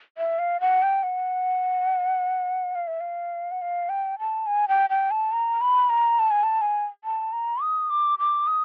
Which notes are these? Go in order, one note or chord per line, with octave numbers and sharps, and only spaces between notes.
E5
F5
F#5
G5
F#5
F5
E5
F5
F#5
F5
G5
A5
G#5
G5
G5
A5
A#5
B5
A#5
A5
G#5
A5
G#5
A5
A#5
D#6
D6
D6
D#6